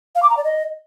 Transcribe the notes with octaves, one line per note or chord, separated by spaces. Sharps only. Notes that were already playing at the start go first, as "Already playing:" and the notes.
F5
D6
A#5
D5
D#5